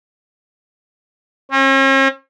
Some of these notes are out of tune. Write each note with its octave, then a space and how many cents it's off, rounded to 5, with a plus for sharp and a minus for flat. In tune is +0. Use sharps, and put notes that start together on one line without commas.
C#4 -45